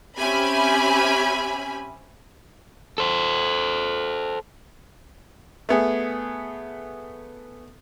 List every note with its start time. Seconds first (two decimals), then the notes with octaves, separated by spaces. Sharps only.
0.18 C4 C#4 G4 E5 G#5 B5
2.98 A4 C5
5.69 A3 B3 G#4